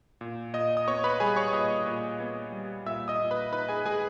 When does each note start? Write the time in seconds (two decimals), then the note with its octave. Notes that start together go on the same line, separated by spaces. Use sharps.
0.21 A#2
0.53 A#2 D#5 D#6
0.77 D#6
0.87 B3 C#5 C#6
1.04 B4 B5
1.20 G3 G#4 G#5
1.36 C#5 C#6
1.53 A#2 D#5 D#6
1.86 A#2
2.20 B3
2.52 G3
2.86 A#2 E5 E6
3.08 D#5 D#6
3.19 A#2
3.31 B4 B5
3.53 D#4 B4 B5
3.69 G#4 G#5
3.85 G#3 G#4 G#5